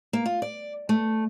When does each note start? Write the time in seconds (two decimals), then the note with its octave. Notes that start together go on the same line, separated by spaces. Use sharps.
0.13 A#3
0.26 F4
0.42 D5
0.89 A3